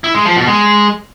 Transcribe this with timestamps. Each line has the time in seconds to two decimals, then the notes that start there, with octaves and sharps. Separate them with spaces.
0.04 E4
0.15 G#3
0.25 F3
0.36 B2
0.47 G#3